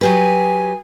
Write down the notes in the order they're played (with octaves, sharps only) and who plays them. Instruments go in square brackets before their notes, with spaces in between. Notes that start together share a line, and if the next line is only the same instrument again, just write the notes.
[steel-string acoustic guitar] F#3 G4 B4 [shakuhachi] G#5